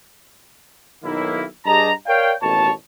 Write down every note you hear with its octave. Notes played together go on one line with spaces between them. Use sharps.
B1 D#3 A#3 E4
G2 G4 G#4 D#5 A5 A#5
A#4 C#5 D5 F5 G5
A1 D#2 B2 A4 C#5 A5